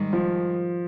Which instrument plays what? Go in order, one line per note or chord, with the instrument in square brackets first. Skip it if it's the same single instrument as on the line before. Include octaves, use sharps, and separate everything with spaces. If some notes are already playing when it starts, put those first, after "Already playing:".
Already playing: [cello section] G#2 D#3 G3
[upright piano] F3